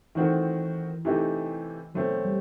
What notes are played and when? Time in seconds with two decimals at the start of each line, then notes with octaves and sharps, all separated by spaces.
0.15 D#3 E3 A3 C4 F#4
1.05 C3 E3 A3 D#4 G4
1.94 B2 F#3 A3 C4
2.25 G3